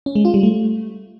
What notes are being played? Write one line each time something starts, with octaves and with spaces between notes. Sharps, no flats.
C#4
G#3
F4
G3
A3